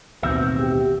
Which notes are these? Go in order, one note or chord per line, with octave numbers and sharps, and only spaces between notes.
A1 D#2 B2 C4 F#4 E5
G4